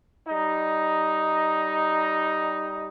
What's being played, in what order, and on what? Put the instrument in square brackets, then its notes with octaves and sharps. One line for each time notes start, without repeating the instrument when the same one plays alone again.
[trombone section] G3 D#4